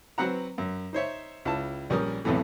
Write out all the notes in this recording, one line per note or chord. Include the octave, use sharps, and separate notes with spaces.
F#3 C4 B4 F#5 A#5
F#2
D#4 C5 C#5 E5
C#2 E4 A5
A#1 G3 C#4 A#4 D#6
B1 F2 A2 C3 E3 A3